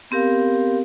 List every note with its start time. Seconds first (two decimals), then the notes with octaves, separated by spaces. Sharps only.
0.11 B3 C4 G4 A#4 F5